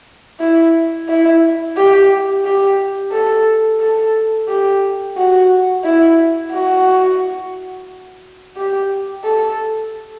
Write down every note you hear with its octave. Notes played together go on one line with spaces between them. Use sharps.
E4
E4
G4
G4
A4
A4
G4
F#4
E4
F#4
G4
A4